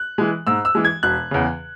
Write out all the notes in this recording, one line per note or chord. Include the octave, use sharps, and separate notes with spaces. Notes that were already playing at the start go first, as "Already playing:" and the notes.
Already playing: F#6
E3 G#3
G#2 E6
E6
E3 G#3
G#6
E1 F#6
E2 C#3